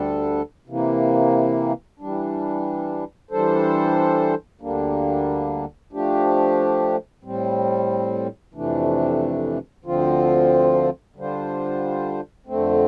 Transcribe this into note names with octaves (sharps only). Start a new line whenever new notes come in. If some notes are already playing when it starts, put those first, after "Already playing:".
Already playing: D2 D3 G3 D4 A4
C3 E3 A#3
E3 G3 D4
E3 G3 D4 A4 C5
D2 D3 G3 A#3 D4
F3 A3 D4 G4
A2 G3 C4
F2 C3 E3 A3 D4
D2 D3 F3 C4 F4
D3 G3 D4 F4 C5
F2 D3 A3 C4